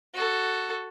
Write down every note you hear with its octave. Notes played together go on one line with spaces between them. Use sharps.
F#4 A4